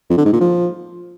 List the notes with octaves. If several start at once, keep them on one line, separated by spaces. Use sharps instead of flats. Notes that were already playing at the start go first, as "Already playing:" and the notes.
F2
D3
G#2
A#2
F3